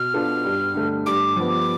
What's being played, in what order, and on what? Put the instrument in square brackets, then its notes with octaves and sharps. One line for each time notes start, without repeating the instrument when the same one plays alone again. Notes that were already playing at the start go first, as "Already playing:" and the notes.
Already playing: [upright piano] B2 [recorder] F6
[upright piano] B3 D4 F4 A4
G2
D3 A3
[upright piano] G2 [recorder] D6
[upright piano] F3 B3